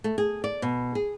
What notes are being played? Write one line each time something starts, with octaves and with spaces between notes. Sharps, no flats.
A3
G#4
D5
B2
G#4